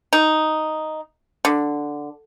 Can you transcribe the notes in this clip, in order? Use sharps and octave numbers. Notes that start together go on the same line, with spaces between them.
D#4
D3